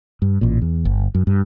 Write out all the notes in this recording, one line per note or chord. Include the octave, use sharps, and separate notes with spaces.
G2
A1 A#2
E2
G1
F#2
G2